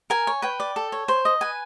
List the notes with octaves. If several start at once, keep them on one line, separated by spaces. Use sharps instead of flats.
A#4 G#5
C#5
B4 G5
D5
A4
C#5
C5
D#5
B4 G#5